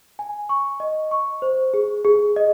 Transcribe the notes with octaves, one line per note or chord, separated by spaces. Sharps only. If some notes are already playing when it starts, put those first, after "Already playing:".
G#5
C#6
D#5
C#6
C5
G#4
G#4
D#5